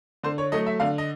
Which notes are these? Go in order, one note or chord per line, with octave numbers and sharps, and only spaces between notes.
D3 C5
C#5
F#3 A3 D#5
E5
D3 F5
D#5